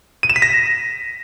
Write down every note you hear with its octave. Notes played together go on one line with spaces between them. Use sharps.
D#7
E7
B6
A#6